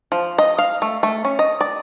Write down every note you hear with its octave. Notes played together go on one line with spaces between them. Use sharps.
F3
D#5
F5
A3
A3
C#4
D#5
D5